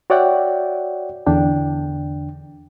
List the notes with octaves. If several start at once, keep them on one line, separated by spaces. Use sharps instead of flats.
F#4 C#5 D5 E5 F#5 G5
E2 D3 D4 G5